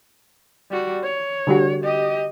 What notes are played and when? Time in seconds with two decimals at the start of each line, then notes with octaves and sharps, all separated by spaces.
0.70 G3 F#4
1.04 C#5
1.47 D3 G3 F#4
1.84 G4 D#5